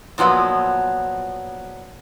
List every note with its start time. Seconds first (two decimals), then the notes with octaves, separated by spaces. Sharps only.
0.18 A#2 F3 F#3 B3